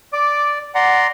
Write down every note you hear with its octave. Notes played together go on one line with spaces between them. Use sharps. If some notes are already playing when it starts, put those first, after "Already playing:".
D5 D6
D5 F#5 A#5 C6